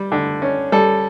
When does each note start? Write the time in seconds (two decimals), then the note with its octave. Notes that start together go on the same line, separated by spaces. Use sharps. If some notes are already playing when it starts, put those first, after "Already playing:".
Already playing: G3
0.12 D3
0.42 C#4
0.72 G3 A4